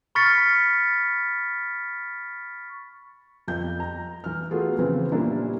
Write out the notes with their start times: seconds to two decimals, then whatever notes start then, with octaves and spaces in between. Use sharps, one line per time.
0.15 B5 C#6 F6 A6 B6 C#7
3.48 F2 G6
3.80 A#5
4.24 E3 F6
4.51 A3 B3 F4 F#4 G#4 A4
4.78 C#3 E3 F3 C4 B4
5.12 A#2 G3 A#3 C#4 D4 E4